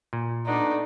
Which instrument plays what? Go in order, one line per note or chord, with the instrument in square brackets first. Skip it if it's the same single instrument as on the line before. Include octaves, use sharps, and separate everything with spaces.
[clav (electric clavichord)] A#2
[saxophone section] A3 B3 D4 [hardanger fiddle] D#4